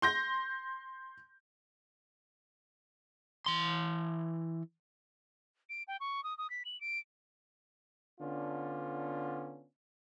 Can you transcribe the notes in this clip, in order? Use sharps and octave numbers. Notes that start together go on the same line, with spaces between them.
C6 G6 A#6
E3 C6
D7
G5
C#6
D#6
D#6
B6
F#7
D7
D3 B3 C#4 D4 F4